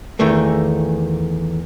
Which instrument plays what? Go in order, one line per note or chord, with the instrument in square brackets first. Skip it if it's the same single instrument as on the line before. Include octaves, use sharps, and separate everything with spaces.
[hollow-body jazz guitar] E2 D#3 E3 A3 A#3